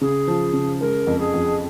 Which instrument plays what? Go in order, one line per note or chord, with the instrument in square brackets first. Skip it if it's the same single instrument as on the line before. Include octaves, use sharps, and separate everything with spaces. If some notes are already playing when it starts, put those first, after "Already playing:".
[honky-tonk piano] C#3 [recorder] G#4
[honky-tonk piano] F3
C#3
[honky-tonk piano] G#3 [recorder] A#4
[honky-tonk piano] F2
[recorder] G#4
[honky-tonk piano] F2